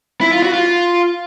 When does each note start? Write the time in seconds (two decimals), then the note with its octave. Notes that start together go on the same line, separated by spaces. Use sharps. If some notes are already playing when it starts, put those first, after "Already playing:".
0.21 E4
0.32 F4
0.43 F#4
0.53 F4